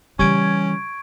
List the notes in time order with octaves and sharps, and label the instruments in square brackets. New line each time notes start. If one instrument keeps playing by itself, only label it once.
[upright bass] C#3 E3 [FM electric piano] G3 [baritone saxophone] C#4 [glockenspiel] C#6 G#6 D7